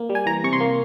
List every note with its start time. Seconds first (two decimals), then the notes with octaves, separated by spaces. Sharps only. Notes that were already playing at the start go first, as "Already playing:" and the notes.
Already playing: A#3
0.10 G3
0.15 G#5
0.26 E3 A#5
0.44 C3 C#6
0.53 C6
0.60 A#3